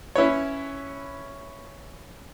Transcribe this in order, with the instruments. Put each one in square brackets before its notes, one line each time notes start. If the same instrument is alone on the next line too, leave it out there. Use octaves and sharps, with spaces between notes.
[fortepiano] C#4 E4 B4 C#5